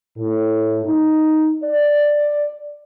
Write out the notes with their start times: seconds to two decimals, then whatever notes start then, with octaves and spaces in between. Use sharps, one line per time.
0.17 A2
0.85 D#4
1.63 D5